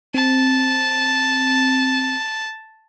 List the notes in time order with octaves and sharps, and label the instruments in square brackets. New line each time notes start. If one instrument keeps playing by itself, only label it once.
[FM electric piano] C4 [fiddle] A5